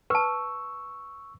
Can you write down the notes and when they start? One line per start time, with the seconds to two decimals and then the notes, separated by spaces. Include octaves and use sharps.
0.10 B4 A5 C#6 E6